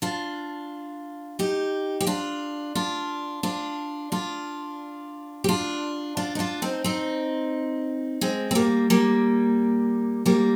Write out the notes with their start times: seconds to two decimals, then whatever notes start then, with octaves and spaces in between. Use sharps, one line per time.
0.02 D4 F4
1.39 D#4 G4
2.00 G4
2.07 D4 F4
2.75 D4 F4
3.43 D4 F4
4.12 D4 F4
5.44 G4
5.49 D4 F4
6.17 D4 F4
6.35 D#4
6.39 D4 F4
6.62 C4 D#4
6.84 C4 D#4
8.21 G#3 C4
8.51 C4
8.55 G3 A#3
8.90 G3 A#3
10.26 G3 A#3